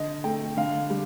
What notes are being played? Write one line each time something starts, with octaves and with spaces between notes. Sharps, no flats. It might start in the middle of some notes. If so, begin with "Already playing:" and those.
Already playing: D3 D#5
A3 G5
D3 F5
G3